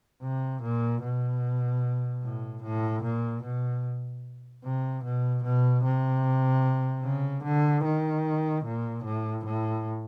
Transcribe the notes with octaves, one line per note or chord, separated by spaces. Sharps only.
C3
A#2
B2
A2
A2
A#2
B2
C3
B2
B2
C3
C#3
D3
D#3
A#2
A2
A2